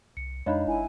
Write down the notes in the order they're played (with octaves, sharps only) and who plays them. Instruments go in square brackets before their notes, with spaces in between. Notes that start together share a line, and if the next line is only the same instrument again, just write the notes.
[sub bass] C2 [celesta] C#7
[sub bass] F2 [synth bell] G#3 D4 D#4 [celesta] C#5 D#5 F5 [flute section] B5
[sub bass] G1 [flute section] E4 G#5